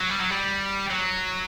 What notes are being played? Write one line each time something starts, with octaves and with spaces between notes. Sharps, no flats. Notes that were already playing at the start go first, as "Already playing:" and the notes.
F#3
G3
F#3
G3
F#3